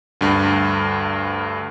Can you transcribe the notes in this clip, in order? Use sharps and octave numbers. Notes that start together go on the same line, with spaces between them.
D2 G2